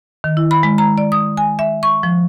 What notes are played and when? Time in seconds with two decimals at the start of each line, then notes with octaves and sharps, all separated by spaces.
0.24 D#3
0.37 E4
0.51 B5
0.63 G#3
0.78 A#5
0.98 D5
1.12 D#6
1.37 G#5
1.59 E5
1.83 C#6
2.03 F3